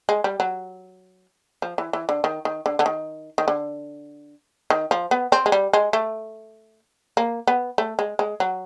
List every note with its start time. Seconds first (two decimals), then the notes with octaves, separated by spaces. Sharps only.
0.09 G#3
0.24 G3
0.40 F#3
1.62 F3
1.78 E3
1.93 E3
2.09 D3
2.24 D#3
2.45 D#3
2.66 D3
2.79 D3
2.86 D#3
3.38 D#3
3.48 D3
4.70 D#3
4.91 F3
5.11 B3
5.32 C4
5.46 G#3
5.52 G3
5.73 G#3
5.93 A3
7.17 A#3
7.47 B3
7.78 A3
7.99 G#3
8.19 G#3
8.40 F#3